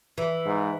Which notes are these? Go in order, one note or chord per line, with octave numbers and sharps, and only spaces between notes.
E3
G#2